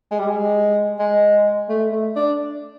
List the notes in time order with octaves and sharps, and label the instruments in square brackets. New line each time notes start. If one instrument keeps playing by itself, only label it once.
[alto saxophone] G#3
G3
G#3
G#3
A3
A3
D4